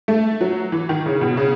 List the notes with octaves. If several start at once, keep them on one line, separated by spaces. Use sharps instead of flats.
A3
F#3
E3
D#3
C#3
B2
C#3